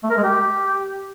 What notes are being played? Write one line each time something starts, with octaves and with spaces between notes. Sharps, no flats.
A3
A#4
G#3
G4